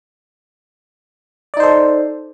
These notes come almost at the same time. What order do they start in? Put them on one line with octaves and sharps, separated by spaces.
D5 D#4 C5 A4